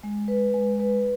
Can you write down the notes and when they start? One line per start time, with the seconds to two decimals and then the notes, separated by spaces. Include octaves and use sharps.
0.03 G#3
0.28 B4
0.54 G#3
0.80 B4